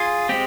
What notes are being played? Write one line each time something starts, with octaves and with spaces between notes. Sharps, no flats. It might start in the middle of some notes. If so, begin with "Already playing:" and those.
Already playing: F4 G#4
G#3 C4 G4